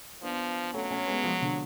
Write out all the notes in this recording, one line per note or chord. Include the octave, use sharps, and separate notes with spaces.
F3 B3 D4
F#3 A3 C#4
A3 C#4
G#3 B3
F3 G#3
D3